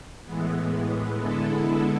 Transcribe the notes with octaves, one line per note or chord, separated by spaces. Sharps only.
A2 E3 G#3 B3
D3 G#3 B3 E4 A4